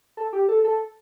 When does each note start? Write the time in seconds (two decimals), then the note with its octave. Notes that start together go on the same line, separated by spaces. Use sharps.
0.17 A4
0.33 G4
0.49 A4
0.64 A4